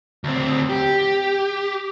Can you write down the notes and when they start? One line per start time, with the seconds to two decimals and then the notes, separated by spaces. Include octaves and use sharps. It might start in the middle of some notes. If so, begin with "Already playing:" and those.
0.24 D2 C4
0.70 G4